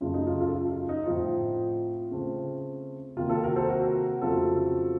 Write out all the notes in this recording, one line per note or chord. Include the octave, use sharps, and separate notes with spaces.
F#2 C#3 A3 F4
D#4
F4
F4 A4
F4
F4
D#4
A2 F3 C4 F4
C#3 A3 C4
C3 D#3 A#3 F4
F4 A4
F#4 A#4
A4 C5
F#4 A#4
F2 C#3 F#3 A3 C4 F4 A4